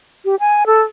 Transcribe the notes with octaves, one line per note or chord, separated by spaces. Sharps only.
G4
G#5
A4